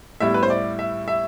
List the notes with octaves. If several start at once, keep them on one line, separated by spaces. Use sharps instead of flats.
A2 G3 B3 E4 E5
B4
C5
D5
E5
E5